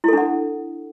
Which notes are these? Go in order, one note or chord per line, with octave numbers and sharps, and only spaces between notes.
D4 E4 A4 F#5